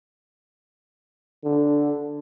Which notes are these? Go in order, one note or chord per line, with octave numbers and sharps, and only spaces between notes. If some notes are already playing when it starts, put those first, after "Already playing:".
D3